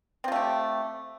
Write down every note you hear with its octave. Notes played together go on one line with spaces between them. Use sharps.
A3 C4 F4 G4